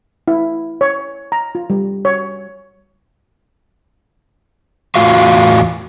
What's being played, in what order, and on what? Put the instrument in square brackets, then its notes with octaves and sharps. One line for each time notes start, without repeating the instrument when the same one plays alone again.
[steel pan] E4
C#5
A#5
F4
G3
C#5
[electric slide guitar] E2 A2 F4 F#4 F5